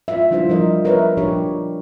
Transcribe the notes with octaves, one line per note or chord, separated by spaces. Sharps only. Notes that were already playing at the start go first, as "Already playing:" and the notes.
G#3 F4 E5
F3 G3 D4 E4 F4 C5
F3 G3 E4 A#4 D#5
A#4 B4 C#5 E5
A#2 F3 D4 G4 C#5